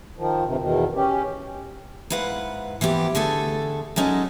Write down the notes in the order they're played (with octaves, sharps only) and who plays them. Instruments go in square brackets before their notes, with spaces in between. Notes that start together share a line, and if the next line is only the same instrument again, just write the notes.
[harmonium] D#3 F3
G2 C3 D#3
E2 B2 D#3
C#4 G4
[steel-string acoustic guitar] G#2 E4 B4 F5 F#5
E3 F3 B3 G4
D3 A3 G#4 A4
F#3 G#3 C#4 D#4 A4